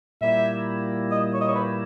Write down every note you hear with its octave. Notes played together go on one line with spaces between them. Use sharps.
A#2 G3 A#3 E4 E5
D#5
C#5
D#5
C#5
B4